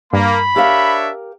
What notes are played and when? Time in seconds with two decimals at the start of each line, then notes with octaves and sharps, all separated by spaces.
0.13 G2 A#3 B5
0.56 D4 G4 A#4 C#5 E5 F5